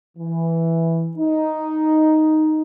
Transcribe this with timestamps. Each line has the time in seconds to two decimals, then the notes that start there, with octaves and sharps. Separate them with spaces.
0.18 E3
1.18 D#4